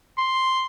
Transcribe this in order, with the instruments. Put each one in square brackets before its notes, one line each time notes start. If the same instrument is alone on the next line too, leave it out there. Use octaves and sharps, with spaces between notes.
[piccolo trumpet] C6